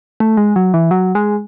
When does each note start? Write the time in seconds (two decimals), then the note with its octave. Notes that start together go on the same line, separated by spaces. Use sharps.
0.20 A3
0.37 G#3
0.56 F#3
0.74 E3
0.91 F#3
1.15 G#3